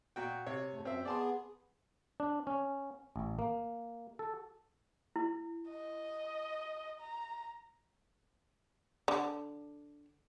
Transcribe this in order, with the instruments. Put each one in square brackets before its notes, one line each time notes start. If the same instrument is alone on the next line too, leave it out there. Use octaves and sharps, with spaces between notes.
[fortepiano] A#2 F#4 G5
C3 C#5
[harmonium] F2 G#2 A3
[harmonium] F#2 [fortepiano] C4 E5
[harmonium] B3 G#4 [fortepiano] D5 A5 C6
[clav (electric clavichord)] D4
C#4
A1
A#3
A4
[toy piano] E4
[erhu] D#5
A#5
[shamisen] D3